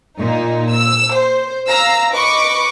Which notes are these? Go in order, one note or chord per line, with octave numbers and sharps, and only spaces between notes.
A#2 D#4
E6
C5
F5 A#5 E6
B4 D#5 C#6 D6